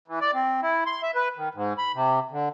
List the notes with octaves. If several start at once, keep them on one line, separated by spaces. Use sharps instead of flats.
E3
D5
C4
E4
C6
E5
B4
D#3
G#2
B5
C3
D3